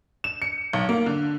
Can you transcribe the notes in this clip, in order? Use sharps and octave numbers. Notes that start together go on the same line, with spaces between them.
E7
C#7
B1
A#3
D3